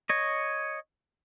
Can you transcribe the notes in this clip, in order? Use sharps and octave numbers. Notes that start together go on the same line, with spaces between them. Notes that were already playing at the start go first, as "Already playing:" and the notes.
C#5 D#5